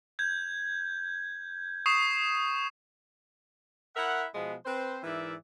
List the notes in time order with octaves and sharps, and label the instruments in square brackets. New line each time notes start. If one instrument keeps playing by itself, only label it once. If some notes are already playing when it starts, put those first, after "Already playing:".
[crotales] G6 G#6
C#6 D#6 C7 E7
[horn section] E4 A#4 E5 F#5
B2 F3 G#3 B3
C4 B4 C5
G#2 E3 A#4 D5 E5